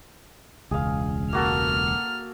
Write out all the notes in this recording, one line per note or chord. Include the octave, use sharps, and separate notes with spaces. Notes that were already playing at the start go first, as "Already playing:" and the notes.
E1 C#2 G#4 F5
A#3 F#4 A4 F6